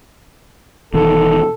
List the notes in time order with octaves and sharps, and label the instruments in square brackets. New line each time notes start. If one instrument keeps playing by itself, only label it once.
[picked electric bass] E1 E2 D#3 [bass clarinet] A4